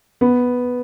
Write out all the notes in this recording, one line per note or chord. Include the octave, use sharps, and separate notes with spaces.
B3